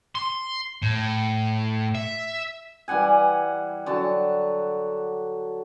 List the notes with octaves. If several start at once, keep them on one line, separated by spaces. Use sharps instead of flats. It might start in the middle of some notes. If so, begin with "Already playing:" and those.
C6
A2
E5
E3 G3 F#5 G#5
D3 F#3 A5